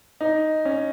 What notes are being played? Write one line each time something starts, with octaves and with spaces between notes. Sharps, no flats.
D#4
C#4